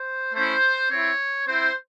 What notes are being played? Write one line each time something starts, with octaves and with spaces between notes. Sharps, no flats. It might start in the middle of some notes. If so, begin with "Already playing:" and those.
Already playing: C5
A3 C#4 E4 C5
C4 E4 C#5
C4 E4 C5